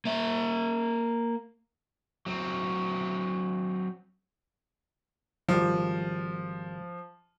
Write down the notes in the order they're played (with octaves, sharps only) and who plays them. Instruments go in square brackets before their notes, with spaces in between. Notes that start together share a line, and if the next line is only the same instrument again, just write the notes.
[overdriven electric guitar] A#3 E5
F#3 C4
[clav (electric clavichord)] G#1 G3 [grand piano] F3